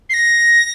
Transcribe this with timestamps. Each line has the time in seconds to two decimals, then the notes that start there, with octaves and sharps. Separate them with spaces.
0.10 C7
0.14 A#6